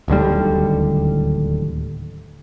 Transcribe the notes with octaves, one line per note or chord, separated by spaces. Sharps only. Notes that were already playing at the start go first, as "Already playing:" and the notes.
D1 D#2 D3 G3